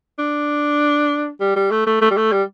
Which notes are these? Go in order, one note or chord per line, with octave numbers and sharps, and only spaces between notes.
D4
G3
G3
A3
A3
A3
G3
A3
G3